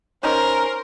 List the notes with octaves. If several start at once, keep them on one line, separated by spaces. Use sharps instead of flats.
C#4 D#4 A#4 C5 A#5